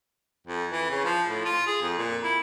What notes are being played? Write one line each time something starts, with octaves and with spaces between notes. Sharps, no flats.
F2
E3
C#3
F3
A2
F4
G#4
F2
A#2
E4